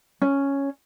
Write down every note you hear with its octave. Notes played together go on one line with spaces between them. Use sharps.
C#4